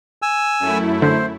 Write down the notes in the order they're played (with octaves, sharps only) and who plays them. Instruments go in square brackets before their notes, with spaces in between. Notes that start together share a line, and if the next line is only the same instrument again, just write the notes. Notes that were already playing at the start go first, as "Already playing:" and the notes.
[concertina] G#5 E6
[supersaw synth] F#2 A3 E4
[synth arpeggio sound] D3 [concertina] C5